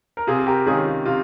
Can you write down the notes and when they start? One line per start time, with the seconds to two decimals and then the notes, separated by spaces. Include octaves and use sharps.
0.17 A#4
0.27 C3 F4 G#4
0.46 G4 A#4
0.66 D#3 G#3 C#4 F4 G#4
0.86 F4
1.06 C3 F4